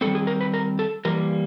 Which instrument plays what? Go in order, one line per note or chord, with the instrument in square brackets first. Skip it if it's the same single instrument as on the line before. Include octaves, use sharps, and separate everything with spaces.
[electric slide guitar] D#3 G3 C4 A4
G#4
A#4
B4
A#4
A4
E3 G3 A#3 A#4